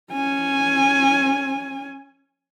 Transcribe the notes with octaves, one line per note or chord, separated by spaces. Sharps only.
C#4 G#5